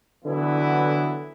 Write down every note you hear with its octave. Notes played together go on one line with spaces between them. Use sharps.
D3 E3 F#3 B3 E4